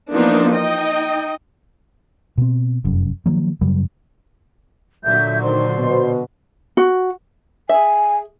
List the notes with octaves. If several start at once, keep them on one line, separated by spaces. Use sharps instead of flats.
E3 F3 A#3 B3 D4 D#4
D#4 D#5 G5
B2 C4
F1 F#2
D#3 F3 F#3 A#3
F#2 C#3 F#3 G3
A#2 D3 F#3 E5 G6
D#3 C5 D5 C6
B2
F#4
G#4 E5 G#5